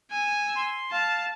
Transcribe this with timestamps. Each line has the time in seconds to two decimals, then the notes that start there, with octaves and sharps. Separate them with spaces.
0.11 G#5 E6
0.56 C6
0.92 F5 A5